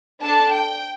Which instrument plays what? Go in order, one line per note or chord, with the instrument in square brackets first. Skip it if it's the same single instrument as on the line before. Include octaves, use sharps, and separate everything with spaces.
[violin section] D4 A4 A5
G5